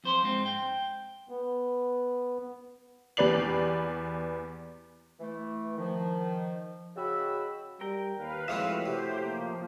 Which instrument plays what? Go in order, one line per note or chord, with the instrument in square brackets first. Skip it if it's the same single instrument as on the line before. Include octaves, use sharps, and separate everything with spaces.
[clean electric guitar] F2 C5 C6
G#2 C4
G5
[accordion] B3
[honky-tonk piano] E2 G4 B4 D5 C7 F#7
[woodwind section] E3 A3
D#3 F3
C#3 F#4 D#5 G5 B5 E6
[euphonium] G3 [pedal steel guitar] A#4 G5
[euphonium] D#2 [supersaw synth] B4 F5
[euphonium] A2 [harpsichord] F3 G#3 C4 [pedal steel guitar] F#4 C#5 E5
[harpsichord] C3 [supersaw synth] G4 C5
[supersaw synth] F3 [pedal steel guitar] A#3